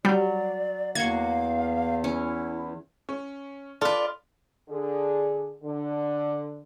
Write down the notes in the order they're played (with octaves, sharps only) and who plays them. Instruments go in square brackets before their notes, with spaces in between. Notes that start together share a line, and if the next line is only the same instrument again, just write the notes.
[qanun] F#3 [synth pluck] G3 [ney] D5
[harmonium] E2 [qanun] A#3 F#4 C#6 [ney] F5 [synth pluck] G#6
[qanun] C#4 [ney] E4
[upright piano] C#4
[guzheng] F4 B4 [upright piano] A4 [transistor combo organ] D5
[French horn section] D3 G#4
D3